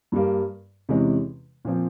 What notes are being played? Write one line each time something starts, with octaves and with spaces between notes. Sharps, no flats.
G2 G3 A#3
E2 C3 E3 G#3 C#4
A#2 F3 C4